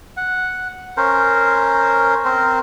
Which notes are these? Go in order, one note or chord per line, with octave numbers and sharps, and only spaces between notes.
F#5
C#4 A#4 C5
C4 A#4 C5